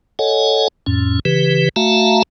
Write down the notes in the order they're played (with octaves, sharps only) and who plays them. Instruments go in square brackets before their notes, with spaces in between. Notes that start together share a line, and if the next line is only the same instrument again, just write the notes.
[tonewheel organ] A4 C#5 D#5 F#5 G#5
F2 A2 C#4
C#3 E3 G4 B4
A3 F#4 E5 F5 A5 A#5